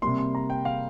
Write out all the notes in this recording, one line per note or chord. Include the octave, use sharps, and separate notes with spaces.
C3 G3 A#3 C6
C6
A#5
G5
F5